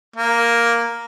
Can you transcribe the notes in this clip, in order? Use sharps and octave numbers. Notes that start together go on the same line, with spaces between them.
A#3